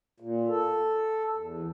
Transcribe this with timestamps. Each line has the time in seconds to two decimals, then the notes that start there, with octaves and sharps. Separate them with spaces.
0.20 A#2
0.48 A4
1.36 E2